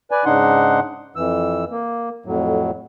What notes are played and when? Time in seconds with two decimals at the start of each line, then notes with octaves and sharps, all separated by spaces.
0.11 B4 D5 G#5
0.26 G#2 C#3 D4 D#4 F#5 C6
1.16 F2 E3 E6
1.70 A#3
2.26 F2 A2 F#3